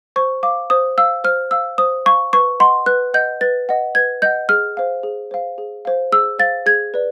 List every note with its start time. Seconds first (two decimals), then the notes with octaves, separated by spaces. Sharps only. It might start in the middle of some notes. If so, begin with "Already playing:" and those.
0.16 C5 C#6
0.43 F5 D6
0.70 C5 D#6
0.98 F5 E6
1.24 C5 F6
1.51 F5 E6
1.78 C5 D#6
2.06 F5 C#6
2.33 B4 C#6
2.60 D#5 F#5 C6
2.86 B4 F#6
3.14 D#5 F#5 G6
3.41 B4 A6
3.69 D#5 F#5
3.95 B4 G#6
4.22 D#5 F#5 G6
4.49 G#4 F6
4.77 C5 F5
5.03 G#4
5.31 C5 F5
5.58 G#4
5.85 C5 F5
6.12 G#4 E6
6.39 C5 F5 A6
6.66 G#4 G#6
6.94 B4 D5